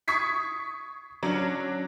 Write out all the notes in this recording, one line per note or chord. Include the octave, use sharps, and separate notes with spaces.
C#6 D#6 G#6 B6 C7
F#3 C#4 D4